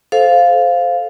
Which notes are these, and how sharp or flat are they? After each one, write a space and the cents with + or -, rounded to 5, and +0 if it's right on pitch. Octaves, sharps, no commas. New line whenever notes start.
A4 -20 C5 +0 F5 +0